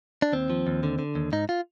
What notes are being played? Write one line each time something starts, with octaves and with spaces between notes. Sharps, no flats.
D4
D#2 C4
F3
D#2
D3
D3
D#2
G#2 D#4
F4